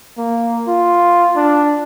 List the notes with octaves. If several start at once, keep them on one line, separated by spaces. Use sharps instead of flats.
A#3
F4
D4